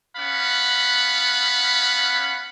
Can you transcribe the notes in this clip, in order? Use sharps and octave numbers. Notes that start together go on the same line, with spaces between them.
B3 C#4 F5 F#5 B5